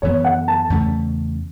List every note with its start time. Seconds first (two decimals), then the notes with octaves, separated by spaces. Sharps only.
0.02 F#2 E3 B3 C#5
0.24 F#5
0.48 A5
0.70 E2 C#3 A3 C#4